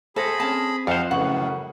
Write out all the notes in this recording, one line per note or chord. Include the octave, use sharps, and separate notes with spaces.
G#4 A4 C5 B5 A#6
C4 C#4 A5
F2 F4 C5 F5 F#5
F#2 A2 C#3 B4 F#5 C#6